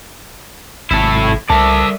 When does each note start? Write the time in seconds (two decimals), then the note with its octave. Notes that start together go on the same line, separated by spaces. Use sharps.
0.91 G#1 G#2 C3 F#3 E4 A4
1.50 C2 G3 A4 A#4 D5 E5 A5